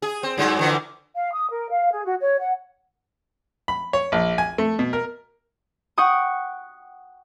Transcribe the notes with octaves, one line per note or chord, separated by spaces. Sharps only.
G#4
C4
G2 F#3 G#3
D3 E3 F3
F5
D#6
A#4
F5
G#4
F#4
C#5
F#5
B5
C#5
A#1
G#5
A3
B2
A#4
F#5 G5 C#6 D#6